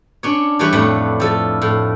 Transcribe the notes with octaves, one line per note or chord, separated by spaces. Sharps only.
C#4 D4 C#5
E3 G3 D4 B4 C#5
F2 A2 A3 B4
F3 A4
A2